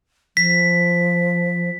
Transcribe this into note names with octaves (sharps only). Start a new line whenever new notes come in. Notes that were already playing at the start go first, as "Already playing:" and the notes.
F3 B6